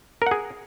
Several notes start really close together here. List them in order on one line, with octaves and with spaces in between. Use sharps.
A#4 F#5 G#4